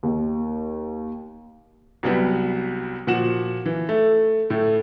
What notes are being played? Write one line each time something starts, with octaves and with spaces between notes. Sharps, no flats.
D#2
C2 F#3 G3 B3
A#2 F3 F#4 F#5 E7
E3
A3
A2 A3